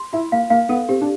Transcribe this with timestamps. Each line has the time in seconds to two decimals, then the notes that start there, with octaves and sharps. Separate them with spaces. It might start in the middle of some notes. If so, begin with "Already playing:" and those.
Already playing: C6
0.13 E4 F4
0.32 A#3 F5
0.50 A#3 F5
0.69 B3 A4
0.89 C4 G4
1.01 D4